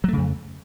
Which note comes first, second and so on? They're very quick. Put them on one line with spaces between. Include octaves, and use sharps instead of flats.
F#3 A3 C#3 F2